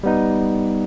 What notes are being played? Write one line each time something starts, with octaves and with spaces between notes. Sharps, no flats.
G3 B3 D#4